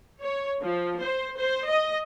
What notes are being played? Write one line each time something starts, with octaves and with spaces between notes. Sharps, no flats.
C#5
F3
C5
C5
D#5